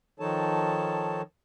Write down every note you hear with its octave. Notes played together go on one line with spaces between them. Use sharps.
D#3 F3 D#4 A4 C#5 A5